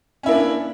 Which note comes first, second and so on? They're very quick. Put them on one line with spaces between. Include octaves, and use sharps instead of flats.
C#4 E4 A#3 D4